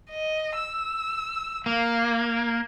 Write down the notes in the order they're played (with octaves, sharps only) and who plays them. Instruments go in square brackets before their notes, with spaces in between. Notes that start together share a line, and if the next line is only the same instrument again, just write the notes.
[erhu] D#5
E6
[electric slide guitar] A#3 [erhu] F5